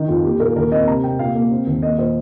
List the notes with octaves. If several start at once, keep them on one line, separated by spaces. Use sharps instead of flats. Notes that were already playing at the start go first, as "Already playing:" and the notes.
Already playing: D#3 D#4
F2 F4
A#3 G4
A#2 A#4
D#2 A#4
C4 D#5
C3 A#5
C3 G5
A#2 F5
A#3
C4
D#2
A#3 D#5
A#2 C5